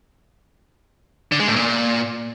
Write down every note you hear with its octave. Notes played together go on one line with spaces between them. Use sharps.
D3
G#3
A2
A#2